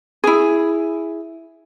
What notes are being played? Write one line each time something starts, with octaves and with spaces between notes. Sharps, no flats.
E4 G#4